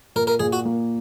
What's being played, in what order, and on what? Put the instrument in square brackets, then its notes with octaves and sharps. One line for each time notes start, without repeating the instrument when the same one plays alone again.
[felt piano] A#2 [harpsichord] A#4
[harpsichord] A#4
[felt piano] A#2 [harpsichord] G#4
[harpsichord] F#4
[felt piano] A#3